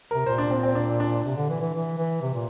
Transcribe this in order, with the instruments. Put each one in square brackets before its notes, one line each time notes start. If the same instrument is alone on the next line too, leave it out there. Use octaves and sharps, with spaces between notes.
[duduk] C3 [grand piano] A#4
[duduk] A#2 [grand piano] C5
[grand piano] D4
C4
C4
D4
D4
[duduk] C3
D3
E3
E3
E3
E3
C3
A#2